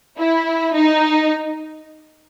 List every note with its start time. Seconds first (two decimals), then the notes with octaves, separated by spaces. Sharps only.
0.18 E4
0.73 D#4